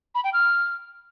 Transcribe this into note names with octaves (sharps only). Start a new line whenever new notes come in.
B5
G5
F6